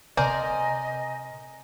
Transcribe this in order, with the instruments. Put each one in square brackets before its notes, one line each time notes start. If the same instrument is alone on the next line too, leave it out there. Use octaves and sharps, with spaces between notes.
[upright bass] C3 [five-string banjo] A#4 C5 D5 [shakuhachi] D#5 [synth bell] G#5